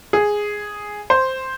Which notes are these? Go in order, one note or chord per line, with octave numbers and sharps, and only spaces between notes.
G#4
C5